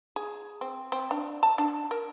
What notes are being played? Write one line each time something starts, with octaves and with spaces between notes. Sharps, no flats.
G#4
C4
C4
D4
A5
D4
A#4